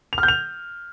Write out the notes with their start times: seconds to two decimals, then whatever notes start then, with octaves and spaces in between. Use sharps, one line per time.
0.13 F7
0.18 F6
0.23 G6
0.28 F7